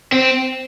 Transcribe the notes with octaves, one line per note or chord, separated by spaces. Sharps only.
C4